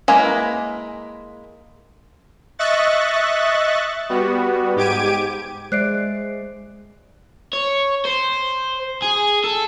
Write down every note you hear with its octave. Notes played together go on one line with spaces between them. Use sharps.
G#3 A#3 E4 A#4 B4
D#5 E5 C#6 F#6 A6
G3 B3 F#4
G#2 G4 D6 G#6 D7 D#7
G#3 C5 D5 E5 F#6 C7 D7
C#5
C5
G#4
A4